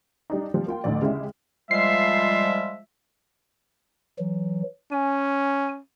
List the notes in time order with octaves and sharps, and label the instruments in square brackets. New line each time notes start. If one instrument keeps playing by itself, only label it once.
[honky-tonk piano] G3 D4 D#4
F3 G3
A#3 F4 G5
A1 D2 F3 A3 D5
C#3 G#3 E4 G4
[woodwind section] F3 G3 [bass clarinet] G#3 [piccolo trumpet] E5 [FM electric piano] C7
[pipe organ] E3 F#3
[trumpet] C#4 [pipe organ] G#5